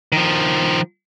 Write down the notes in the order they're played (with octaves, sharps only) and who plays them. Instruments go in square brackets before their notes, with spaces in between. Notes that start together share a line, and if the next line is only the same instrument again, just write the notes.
[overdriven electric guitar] D#3 F3